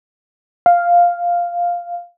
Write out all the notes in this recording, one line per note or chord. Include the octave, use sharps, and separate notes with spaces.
F5